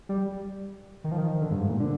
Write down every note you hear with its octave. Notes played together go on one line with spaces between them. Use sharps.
G3
D#3
F3
D#3
D3
G2
G#2
A#2
D3